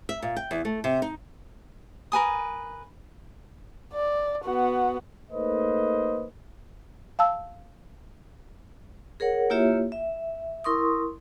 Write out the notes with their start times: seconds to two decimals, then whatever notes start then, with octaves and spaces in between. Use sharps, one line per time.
0.09 E5
0.22 A#2
0.36 G5
0.51 E2
0.65 A3
0.84 C3
1.02 D#4
2.12 A#4 B4 G#5 D#6
3.94 D5
4.44 B3 F#4
5.31 A3 A#3 D#4 B4 C5 D#5
7.19 F5 A5 E6
9.20 G#4 A#4 C#5 F#5
9.50 A#3 E4 F4 G4 C#5 E5
9.92 E5
10.64 E4 A#4 C6 C#6 D#6